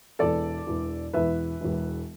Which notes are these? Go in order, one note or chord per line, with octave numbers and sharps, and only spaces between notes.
E1 E2 E3 A4 D5
E1 E2 E3
E1 E2 E3 B4 E5
E1 E2 E3